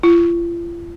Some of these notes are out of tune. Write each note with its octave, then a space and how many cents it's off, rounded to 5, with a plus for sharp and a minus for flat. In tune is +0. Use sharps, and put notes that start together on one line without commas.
F4 -40